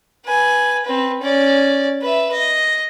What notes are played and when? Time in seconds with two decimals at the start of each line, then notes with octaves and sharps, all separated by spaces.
0.25 B4 G#5
0.84 C4 B4
1.22 C#4 D5
2.01 B4 E5
2.32 D#5